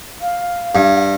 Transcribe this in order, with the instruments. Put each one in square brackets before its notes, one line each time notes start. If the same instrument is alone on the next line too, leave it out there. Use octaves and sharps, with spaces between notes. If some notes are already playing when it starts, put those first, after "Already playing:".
[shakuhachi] F5
[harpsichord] G2